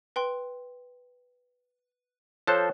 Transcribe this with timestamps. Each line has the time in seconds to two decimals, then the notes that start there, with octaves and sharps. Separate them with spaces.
0.16 B4 G5 C6
2.47 F3 A4 C5 C#5 F#6